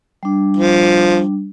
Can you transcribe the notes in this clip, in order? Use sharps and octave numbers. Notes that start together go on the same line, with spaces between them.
G3 D4
F3